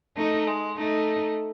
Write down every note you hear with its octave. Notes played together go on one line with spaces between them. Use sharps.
A3 D#4
G#3
A3 D#4